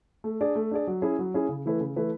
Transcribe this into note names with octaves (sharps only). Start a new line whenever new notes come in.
A3
D4 G#4 D5
A3
D4 G#4 D5
F#3
C#4 E4 G#4
F#3
C#4 E4 G#4
C#3
E3 A3 E4 B4
C#3
E3 A3 E4 B4